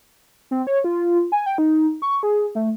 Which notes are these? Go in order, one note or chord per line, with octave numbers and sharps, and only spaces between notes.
C4
C#5
F4
G#5
G5
D#4
C#6
G#4
A3